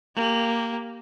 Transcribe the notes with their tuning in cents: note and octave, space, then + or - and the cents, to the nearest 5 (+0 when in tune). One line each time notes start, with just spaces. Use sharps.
A#3 -10 G4 +0